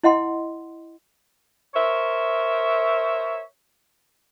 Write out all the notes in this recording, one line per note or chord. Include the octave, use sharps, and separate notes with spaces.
E4 D#5 F#5 C6
A#4 C5 C#5 E5